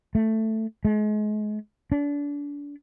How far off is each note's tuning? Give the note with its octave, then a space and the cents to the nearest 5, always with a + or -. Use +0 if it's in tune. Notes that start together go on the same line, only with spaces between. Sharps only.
A3 +5
G#3 +35
D4 -30